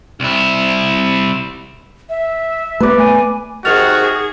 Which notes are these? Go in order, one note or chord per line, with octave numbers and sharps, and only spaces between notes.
C2 E4
E5
A3 B3 B4 D5
A3 G#5
C3 D#3 F#4 G#4 F6 A6 F7